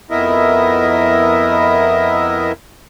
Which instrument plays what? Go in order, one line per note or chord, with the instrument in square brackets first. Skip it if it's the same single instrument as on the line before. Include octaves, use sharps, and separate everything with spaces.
[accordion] F2 B3 E4 A#4 D#5 E5